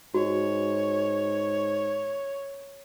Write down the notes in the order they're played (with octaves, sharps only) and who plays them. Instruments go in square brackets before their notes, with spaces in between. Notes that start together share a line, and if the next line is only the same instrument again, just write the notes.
[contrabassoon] G#2 [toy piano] F#4 [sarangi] C#5